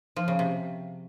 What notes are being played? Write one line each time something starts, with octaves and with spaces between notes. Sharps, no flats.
F3
C#3
C3